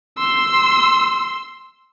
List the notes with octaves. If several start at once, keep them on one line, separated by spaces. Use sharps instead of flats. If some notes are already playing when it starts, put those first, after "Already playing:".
C6 E6